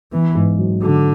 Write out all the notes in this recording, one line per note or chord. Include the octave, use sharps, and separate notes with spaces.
E3 B3
G#2
F#3
D3 F#4